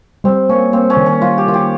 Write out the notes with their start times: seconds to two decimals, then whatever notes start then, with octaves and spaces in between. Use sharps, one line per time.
0.24 G3 C4
0.49 A#3 C#4
0.73 A#3 C4
0.90 C#4
0.97 D#3
1.06 C#4
1.21 G3 F4
1.38 G4
1.47 D#3 F4
1.54 G4